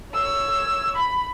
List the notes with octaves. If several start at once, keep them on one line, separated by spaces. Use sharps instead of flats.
C#5 E6
B5